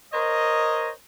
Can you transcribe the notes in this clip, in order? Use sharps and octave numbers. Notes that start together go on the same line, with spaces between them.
A#4 C5 C#5 D#5